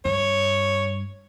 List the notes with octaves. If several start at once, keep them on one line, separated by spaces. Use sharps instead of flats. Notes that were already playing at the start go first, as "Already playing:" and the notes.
G2 C#5